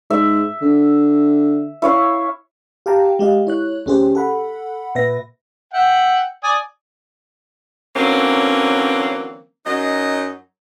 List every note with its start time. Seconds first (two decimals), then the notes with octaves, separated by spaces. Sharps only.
0.10 G#2 E5
0.62 D3
1.82 E4 C#5 F5
2.86 G4 F5 G5 A5 A#5
3.19 G#3 G4 D#5 F5
3.47 E4 C#5 F#6
3.86 D2 C#4 G4 G#4 C5
4.15 A4 F#5 B5
4.95 A#2 B4 E5 A#6
5.73 E5 F#5 G5
6.44 D5 G#5 D#6
7.95 D3 E3 F#3 A#3 C4 C#4
9.65 F#2 F#3 D#4 D#5